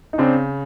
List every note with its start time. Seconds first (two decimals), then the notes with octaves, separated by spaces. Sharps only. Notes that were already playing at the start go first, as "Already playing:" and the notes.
0.13 D#4
0.18 C#3 C4 D4